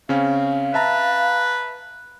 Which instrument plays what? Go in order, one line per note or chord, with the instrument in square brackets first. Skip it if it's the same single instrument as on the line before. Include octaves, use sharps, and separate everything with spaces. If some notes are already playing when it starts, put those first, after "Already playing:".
[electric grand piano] C#3 C4 C#4 [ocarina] F5
[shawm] B4 [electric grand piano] E5 A5 A#5